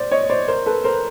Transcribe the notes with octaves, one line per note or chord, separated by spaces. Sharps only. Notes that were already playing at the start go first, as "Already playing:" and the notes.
Already playing: C5 D5
C#5 D#5
C5 D5
A#4 C5
A4 B4
A#4 C5